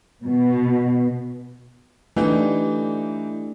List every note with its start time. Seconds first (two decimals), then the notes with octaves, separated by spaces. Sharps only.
0.24 B2
2.16 E3 A3 D4 D#4 G4